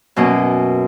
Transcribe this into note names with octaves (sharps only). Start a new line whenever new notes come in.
F#2 B2 A#3 C#4